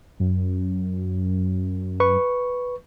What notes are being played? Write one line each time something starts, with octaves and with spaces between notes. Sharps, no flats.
F#2
B4 C#6